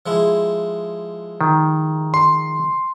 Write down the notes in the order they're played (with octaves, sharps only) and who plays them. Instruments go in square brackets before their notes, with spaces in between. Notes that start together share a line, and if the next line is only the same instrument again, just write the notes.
[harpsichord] F3 G#3 E4
[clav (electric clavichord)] D#3
[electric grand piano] C6